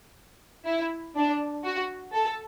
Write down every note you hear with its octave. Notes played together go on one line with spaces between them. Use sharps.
E4
D4
F#4
A4